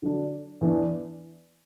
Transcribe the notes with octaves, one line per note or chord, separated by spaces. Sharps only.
D3 F#3 D4
E2 E3 D4